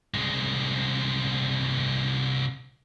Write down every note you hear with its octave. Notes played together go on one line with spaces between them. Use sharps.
C2 G#3